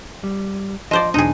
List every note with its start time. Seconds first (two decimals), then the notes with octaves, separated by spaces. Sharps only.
0.24 G3
0.91 F3 C5 D5 D#5
1.14 B1 E2 D4 D#4 G#4